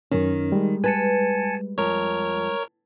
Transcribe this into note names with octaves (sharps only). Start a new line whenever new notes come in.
F#2 D#3 C#4
G3 G#3
B4 G#5 A5 C#7
F2 A#4 C#5